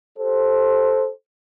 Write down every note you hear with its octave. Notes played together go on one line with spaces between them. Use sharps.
G4 A4 C5